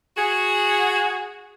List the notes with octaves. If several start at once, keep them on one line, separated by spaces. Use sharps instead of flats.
F#4 G#4